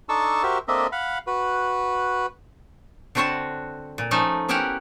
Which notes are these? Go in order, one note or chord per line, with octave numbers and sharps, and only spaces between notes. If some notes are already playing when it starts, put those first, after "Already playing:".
D4 D#4 A4 A5 C#6 E6
F#4 G4 A#4 C5 E5
A#3 C4 D4 A4 D#5 E5
F5 F#5 B5
F#4 B4
D3 C4 F#4 C#5 F#5 A5
A#2
F3 A3 C#4 D#4
B3 C#4 E4 G4 A#4 F#5